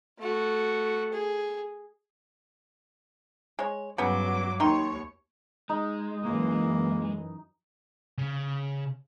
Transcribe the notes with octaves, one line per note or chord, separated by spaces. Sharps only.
A3 F#4
G#4
G#3 C#5
G2 C#3 F#3 B3 D6
D#2 D#3 D#4 C#5 C6
G#3 D#4
F#2 E3 A#3
C#3